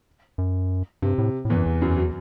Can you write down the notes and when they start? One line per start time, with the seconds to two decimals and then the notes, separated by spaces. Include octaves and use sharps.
0.38 F#2
1.02 G2 C3
1.18 A2
1.45 A2
1.50 E2 E3
1.55 F#2
1.66 E2
1.81 F#2 F#3
1.97 F#3